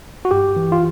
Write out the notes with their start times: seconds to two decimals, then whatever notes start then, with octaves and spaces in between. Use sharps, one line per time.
0.25 F#4
0.31 G2 G4
0.56 E3
0.72 F4